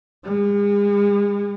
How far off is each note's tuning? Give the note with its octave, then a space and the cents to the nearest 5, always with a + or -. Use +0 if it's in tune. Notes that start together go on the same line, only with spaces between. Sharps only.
G#3 -40